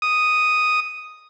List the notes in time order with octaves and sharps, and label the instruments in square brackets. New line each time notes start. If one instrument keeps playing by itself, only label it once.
[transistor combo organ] D#6